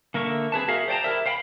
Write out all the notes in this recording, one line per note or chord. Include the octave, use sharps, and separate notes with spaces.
D3 A#3 A#4 E5 C#6
C4 G#4 B4 A5
F#4 G#4 A#4 E5 F5
C5 D5 G5 A5 A#5
E4 G4 A#4 E5
C5 F5 G5 A5 B5